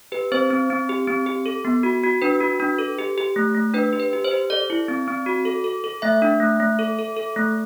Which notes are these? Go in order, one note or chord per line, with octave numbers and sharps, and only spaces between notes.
G4 B4
C4 C5
C4
C4
G4
C4
G4
A4
B3
F#4
F#4
D4 B4
F#4
D4
A4
G4
G4
A3
A3
D4 B4
G4
B4
G4
C5
G4
A4 D5
E4
C4
C4
F#4
A4
A4
A4
A3 E5
D4
A3
A3
A4
A4
A4
A3